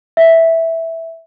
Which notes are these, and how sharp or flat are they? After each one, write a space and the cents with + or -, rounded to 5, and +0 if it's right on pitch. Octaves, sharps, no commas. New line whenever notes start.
E5 -5